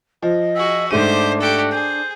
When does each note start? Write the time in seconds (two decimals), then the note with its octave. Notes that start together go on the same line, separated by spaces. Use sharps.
0.23 F3 D#5
0.56 F#4 G#4 E5
0.91 G#2 A3 D4 G4 C5 D#7
1.40 F#4 G4 A4
1.71 G#4 C5